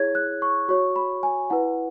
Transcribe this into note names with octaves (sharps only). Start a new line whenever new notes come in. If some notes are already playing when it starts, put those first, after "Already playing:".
Already playing: E4 G#4 C#5 G#6
F#6
C#6
F#4 C#5 C#6
B5
G#5
E4 B4 F#5